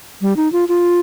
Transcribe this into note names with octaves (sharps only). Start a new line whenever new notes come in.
G3
D#4
F4
F4